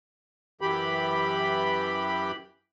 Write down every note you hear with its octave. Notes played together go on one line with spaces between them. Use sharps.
F#2 E3 G4 B5